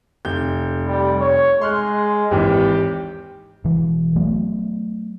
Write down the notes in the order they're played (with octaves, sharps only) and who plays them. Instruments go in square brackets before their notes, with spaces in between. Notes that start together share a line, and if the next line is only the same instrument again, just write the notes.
[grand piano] F1 G6
[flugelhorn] G3
C#5
[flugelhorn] G#3 [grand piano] C6 F6 F#6
[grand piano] G#1 D#2 E3 [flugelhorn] G4
[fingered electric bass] E1 E3
F#3 A3 B3